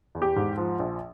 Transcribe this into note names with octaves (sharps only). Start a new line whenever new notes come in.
E2
G4
G#2
F3
A#1